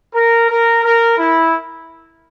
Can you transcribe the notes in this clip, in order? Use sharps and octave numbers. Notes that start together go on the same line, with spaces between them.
A#4
A#4
A#4
E4